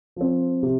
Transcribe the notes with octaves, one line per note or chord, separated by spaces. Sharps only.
F3 C4
C3 G4